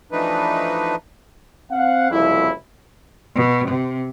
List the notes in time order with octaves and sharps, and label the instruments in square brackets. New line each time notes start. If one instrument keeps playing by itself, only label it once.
[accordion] E3 F3 A3 D4 D#4 B4
[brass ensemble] C4 F5 F#5
F#1 C2 F2 E4
[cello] B2
C3